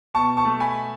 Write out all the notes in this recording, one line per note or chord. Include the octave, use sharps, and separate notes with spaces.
B2 A5 C#6
A5 C#6
A3
G#5 B5